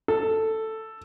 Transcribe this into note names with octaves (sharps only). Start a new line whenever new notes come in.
A4